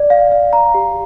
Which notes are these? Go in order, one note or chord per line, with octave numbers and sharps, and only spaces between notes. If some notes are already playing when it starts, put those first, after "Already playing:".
Already playing: D5
F5
F5
A#5
G4